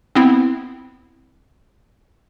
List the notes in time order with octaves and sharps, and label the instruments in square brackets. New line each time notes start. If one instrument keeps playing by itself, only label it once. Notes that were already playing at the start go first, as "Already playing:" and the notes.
[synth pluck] B3 C4 E4